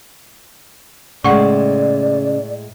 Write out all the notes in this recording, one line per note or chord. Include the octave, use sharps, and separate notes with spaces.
A2 C#3 G#3 D5 F#5 G5 C#6